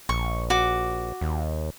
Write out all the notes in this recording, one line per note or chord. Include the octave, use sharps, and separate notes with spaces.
A#1 C#6
F#4 D6
D#2